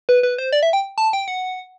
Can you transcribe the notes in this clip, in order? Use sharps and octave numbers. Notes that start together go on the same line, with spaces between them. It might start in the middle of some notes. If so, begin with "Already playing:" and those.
B4
B4
C5
D5
E5
G5
A5
G5
F#5